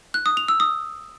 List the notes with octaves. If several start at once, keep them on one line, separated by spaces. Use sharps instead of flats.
F#6
D#6
F7
E6
D#6